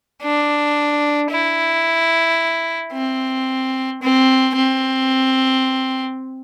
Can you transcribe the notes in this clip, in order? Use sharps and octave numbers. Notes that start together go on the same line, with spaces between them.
D4
E4
C4
C4
C4